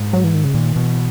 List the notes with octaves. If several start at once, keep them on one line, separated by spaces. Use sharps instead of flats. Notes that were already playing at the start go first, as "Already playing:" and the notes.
Already playing: G#2
F#3
E3
D#3
C#3
A#2 D#3
B2 E3